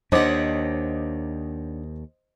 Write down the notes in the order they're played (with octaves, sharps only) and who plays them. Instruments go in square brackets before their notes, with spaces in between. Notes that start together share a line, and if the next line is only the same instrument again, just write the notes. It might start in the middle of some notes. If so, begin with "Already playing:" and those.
[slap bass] D#2 [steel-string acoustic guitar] D4 C#5 F#5 [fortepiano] C5 D#5 D6